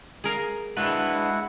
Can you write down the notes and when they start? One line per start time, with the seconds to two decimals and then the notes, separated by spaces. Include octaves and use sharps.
0.24 G#4 A#4 F5
0.77 G#3 D4 E4 F#4 B4 F#5